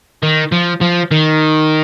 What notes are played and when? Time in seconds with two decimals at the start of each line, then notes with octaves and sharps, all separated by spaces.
0.23 D#3
0.52 F3
0.81 F3
1.11 D#3